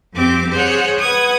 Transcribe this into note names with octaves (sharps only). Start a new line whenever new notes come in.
F2 C4 G4 D6
G#4 C5 C#5 F#5
B4 F#5 D#6 G#6